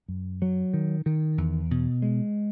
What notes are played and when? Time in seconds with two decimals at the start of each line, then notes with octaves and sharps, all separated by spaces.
0.08 F#2
0.42 F#3
0.74 D#3
1.06 D#3
1.38 E2
1.71 B2
2.02 G#3